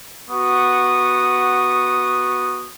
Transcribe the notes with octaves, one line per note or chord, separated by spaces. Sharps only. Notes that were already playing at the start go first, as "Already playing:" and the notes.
B3 F#4 C#6 D#6